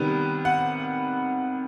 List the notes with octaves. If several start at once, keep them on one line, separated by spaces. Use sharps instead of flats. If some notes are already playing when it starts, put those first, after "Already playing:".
Already playing: C3 D#3 G3 B3
F#5